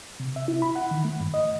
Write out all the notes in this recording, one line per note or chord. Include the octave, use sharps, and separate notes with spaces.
C3
E5
E4
B5
F#5
D#3
A3
G2
D#5